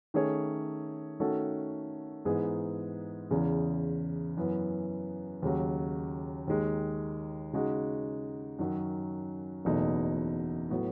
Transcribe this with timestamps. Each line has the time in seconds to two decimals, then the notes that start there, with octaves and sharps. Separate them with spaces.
0.14 D#3 A3 C#4 G#4 C#5
1.20 D#3 A3 C#4 F#4 A4
2.25 G#2 E3 B3 D#4 G#4
3.31 E2 C#3 E3
4.37 F#2 E3 B3
5.42 D#2 C#3 F#3
6.47 D#2 D#3 G#3
7.53 C#3 G#3 D#4 F#4
8.59 F#2 D#3 F#3
9.65 F#1 E2 B2 A3 D#4
10.70 A2 F#3 B3 F#4 B4